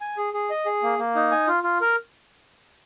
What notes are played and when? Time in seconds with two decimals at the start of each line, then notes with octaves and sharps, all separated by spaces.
0.01 G#5
0.17 G#4
0.34 G#4
0.50 D#5
0.66 G#4
0.83 A#3
0.99 A#3
1.15 D#4
1.31 G#5
1.47 F4
1.63 F4
1.81 A#4